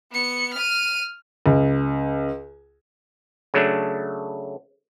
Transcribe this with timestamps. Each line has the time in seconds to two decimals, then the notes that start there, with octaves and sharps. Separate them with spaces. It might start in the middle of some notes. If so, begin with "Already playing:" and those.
0.12 B3 C#7
0.54 F6 D#7
1.46 C#2
3.54 C#3 F#3 A3 D4